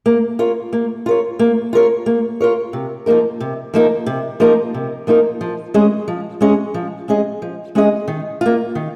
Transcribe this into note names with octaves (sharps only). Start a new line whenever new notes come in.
A#3
F4 A#4 C#5
A#3
F4 A#4 C#5
A#3
F4 A#4 C#5
A#3
F4 A#4 C#5
C3
F3 A#3 D#4 A#4
C3
F3 A#3 D#4 A#4
C3
F3 A#3 D#4 A#4
C3
F3 A#3 D#4 A#4
F3
G#3 C#4 G#4 D#5
F3
G#3 C#4 G#4 D#5
F3
G#3 C#4 G#4 D#5
F3
G#3 C#4 G#4 D#5
D#3
A#3 F4
D#3